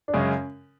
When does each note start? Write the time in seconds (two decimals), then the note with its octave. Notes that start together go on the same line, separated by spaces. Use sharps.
0.08 D4
0.14 F#2 C#3 G#3 C#4